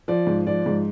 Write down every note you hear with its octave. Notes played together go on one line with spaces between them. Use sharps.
F3 D5
G#2
F3 D5
G#2